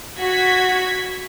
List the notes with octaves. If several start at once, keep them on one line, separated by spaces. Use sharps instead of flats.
F#4 G#6 B6